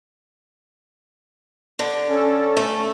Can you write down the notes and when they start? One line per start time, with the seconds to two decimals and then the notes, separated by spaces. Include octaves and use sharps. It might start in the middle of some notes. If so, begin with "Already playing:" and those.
1.79 D3
2.08 C#4 A4
2.57 A3